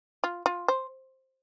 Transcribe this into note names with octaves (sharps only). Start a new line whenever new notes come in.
F4
F4
C5